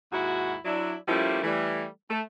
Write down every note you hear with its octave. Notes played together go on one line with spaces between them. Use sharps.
D#2 G#2 E4 F#4
F#3 D4 E4
F3 G3 A3 A#3 C#4 E4
E3 G3 A3
A3